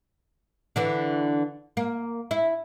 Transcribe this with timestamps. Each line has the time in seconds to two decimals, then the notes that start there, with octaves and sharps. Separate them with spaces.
0.76 D3 E3 D4
1.77 A#3
2.31 E4